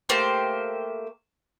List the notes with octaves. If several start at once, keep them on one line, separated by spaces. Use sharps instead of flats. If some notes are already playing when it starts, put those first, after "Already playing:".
A3 A#3 G4 C5